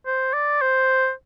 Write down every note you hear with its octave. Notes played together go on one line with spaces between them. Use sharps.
C5
D5
C5